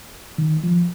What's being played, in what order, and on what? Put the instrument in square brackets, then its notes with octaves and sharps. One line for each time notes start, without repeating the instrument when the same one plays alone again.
[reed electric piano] D#3
F3